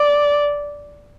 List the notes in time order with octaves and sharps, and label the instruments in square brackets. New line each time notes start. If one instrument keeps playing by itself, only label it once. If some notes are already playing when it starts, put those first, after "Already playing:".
Already playing: [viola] D5